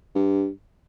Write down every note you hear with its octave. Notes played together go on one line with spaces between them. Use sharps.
G2